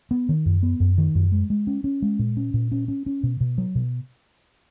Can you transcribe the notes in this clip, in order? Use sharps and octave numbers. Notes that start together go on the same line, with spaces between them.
B3
D#3
F#2
B3
F#2
D#3
F#2
G#3
G#3
C#4
C#4
G#3
A#2
C#4
A#2
C#4
C#4
C#4
B2
B2
F#3
B2